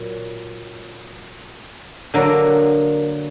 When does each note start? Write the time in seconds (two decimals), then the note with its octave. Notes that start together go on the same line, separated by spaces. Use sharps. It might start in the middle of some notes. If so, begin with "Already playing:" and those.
Already playing: A#2 F#3
2.14 D3 F#3 A#3